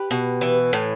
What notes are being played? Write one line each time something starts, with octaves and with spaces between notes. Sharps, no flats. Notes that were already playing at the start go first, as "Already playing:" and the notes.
Already playing: G4 B4
B2
E3
A2